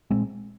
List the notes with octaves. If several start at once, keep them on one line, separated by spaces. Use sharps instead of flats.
A#2 G#3 C4